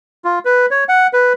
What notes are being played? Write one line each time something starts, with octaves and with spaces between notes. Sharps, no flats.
F4
B4
C#5
F#5
B4